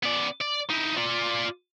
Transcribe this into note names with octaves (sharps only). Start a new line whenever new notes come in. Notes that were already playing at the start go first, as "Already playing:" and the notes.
B3 D5
D5
D#4 E4
F4 D5